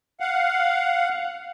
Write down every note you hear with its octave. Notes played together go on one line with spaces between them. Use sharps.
F5 F#5